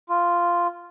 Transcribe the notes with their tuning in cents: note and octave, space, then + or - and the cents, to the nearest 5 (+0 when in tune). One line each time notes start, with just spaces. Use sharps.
F4 -5